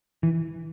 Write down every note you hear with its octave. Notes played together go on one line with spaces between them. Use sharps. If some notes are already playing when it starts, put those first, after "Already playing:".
E3